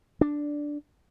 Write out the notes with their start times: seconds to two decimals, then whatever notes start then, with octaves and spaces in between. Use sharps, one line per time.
0.21 D4